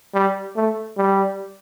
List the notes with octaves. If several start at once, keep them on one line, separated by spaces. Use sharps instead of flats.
G3
A3
G3